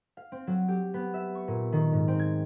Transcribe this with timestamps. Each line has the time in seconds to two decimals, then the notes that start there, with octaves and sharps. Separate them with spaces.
0.17 F5
0.32 C4
0.47 F#3
0.68 G4
0.94 B3
1.14 E5
1.35 C#6
1.48 A#2
1.72 D#3
1.92 G#2
2.08 C4
2.19 G#6